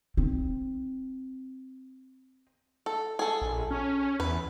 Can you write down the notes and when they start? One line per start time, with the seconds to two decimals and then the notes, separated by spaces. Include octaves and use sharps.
0.17 C4 D#4
2.86 A4
3.19 G#4 A4
3.42 A#1
3.71 C#4
4.20 E2 B4